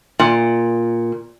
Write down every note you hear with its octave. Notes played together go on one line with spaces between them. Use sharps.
A#2